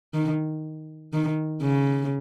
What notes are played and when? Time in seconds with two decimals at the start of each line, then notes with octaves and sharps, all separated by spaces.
0.14 D#3
1.13 D#3
1.62 C#3